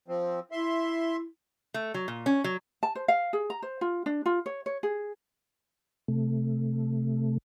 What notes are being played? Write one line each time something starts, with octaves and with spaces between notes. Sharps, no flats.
F3 C4
E4 E5 C6
A3
F#3
A#2
C#4
F#3
A5
C5
F5
G#4
A#5
C5
F4
D4
F4
C#5
C#5
G#4
C3 A3